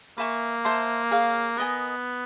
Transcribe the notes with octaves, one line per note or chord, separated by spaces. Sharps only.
A#3 B4 E5 G#5 C#6
C5 E5 A5 C6
G#4 C#5 F5
B3 A#4 D#5 G#5